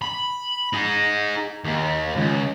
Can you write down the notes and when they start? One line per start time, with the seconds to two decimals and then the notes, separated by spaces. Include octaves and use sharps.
0.02 B5
0.73 D#4 G#4
1.64 D#2
2.16 C#2